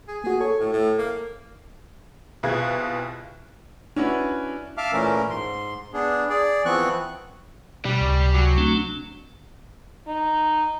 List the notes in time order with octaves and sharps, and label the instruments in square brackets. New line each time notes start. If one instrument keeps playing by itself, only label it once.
[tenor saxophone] G#4
[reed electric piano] A#3 F#4 [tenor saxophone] G#4
[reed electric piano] A4 [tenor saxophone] C#5
[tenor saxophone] A2
A2
A#3
[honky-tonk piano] C2 B2 F4 G#4 F#6 G#6
[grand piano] C#4 D4 E4 F#4 B4
[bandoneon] E5 F5 A5 D6 F6
A#2 E3 A3 C#4 A#4
G#2 C6
B3 D4 G#4
G#4 D5
E3 F3 B3 C4 C#6 F#6
[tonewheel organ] B2 [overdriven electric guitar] G3
[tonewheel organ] C#2 C3
[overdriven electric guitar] F#3
[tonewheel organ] A3 C4 D4
[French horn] D#4